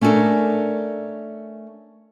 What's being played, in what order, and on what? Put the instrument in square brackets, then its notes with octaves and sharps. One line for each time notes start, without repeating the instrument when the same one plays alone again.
[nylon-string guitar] A3 C#4 D4 F#4 A4 A#4